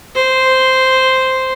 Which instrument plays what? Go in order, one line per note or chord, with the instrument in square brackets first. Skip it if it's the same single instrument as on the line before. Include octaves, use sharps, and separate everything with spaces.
[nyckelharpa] C5